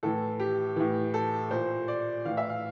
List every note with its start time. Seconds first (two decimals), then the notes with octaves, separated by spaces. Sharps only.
0.03 A2 E3 A4
0.39 G4
0.76 A2 E3
1.14 A4
1.51 A#2 C5
1.88 D5
2.25 A2 E3 F5
2.37 E5
2.49 F5